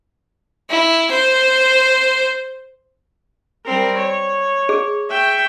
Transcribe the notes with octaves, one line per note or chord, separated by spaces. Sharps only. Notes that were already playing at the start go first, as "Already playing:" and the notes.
E4
C5
G3 C4 A#4
C#5
G#4
E5 G5 C#6